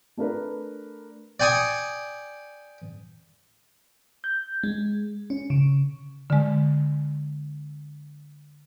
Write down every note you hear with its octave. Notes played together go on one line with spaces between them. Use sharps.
A3 D4 A#4 B4
D5 G5 G#5 C#6 D#6
G6
G#3
C#4
C#3
D3 G#3